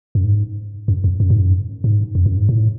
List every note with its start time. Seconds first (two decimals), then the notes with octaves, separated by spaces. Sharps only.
0.15 F#2
0.24 G#2
0.88 F#2
1.04 F2
1.20 F#2
1.30 G#2
1.40 F#2
1.84 G#2
2.15 F2
2.26 F#2
2.37 G#2
2.49 A2